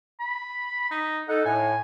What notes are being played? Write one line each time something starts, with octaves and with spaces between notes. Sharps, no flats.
B5
D#4
D#4 A4 F#5
A2 G#5